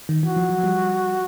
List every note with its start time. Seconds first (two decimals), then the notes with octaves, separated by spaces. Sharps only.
0.09 D#3
0.23 E3 F#4
0.36 F3
0.50 F#3
0.63 F3 G3